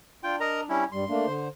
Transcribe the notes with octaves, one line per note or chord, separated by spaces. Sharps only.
D4 F4 G5
A#4 D#5 A#5
G3 C#4 E4
G2 G3 C6
A3 A#3 D4
D3 C5